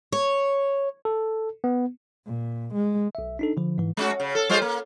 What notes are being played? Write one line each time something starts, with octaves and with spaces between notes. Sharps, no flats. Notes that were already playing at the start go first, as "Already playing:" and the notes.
C#5
A4
B3
A#2
G#3
B1 E5
D4 D#4 A4
D3 F3
G#2 E3
G#3 C#4 F#4
C#3
A4
G3 F4 C5
A#3